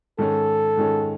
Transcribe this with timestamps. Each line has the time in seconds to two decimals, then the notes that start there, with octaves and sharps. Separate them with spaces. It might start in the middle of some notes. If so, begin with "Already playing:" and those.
0.19 G#2 D#3 G#3 C#4 A4
0.77 G#2 D#3 G#3 C#4